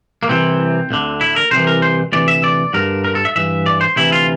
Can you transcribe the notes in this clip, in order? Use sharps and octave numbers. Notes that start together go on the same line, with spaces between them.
A#3
C2 C3 E3 C4
D2 D3
E4
A#4
C2 C3 E3 C5
A#4
C5
D2 C3 E3 D5
E5
D5
G2 D3 A#4
A#4
A4
E5
G2 E3 E5
D5
C5
D2 C3 E3 E4
F4